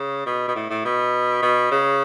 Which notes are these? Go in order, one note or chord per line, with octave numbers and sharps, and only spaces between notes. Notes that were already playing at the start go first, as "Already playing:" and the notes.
Already playing: C#3
B2
B2
A2
A2
B2
B2
C#3